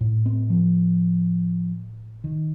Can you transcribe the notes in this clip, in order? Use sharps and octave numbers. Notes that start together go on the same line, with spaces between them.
A2
C4
F3
D#3